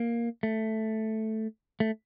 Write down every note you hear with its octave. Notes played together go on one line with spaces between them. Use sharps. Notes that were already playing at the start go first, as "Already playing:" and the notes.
Already playing: A#3
A3
A3